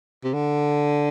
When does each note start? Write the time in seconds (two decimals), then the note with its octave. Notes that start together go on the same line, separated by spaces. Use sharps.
0.24 C3
0.34 D3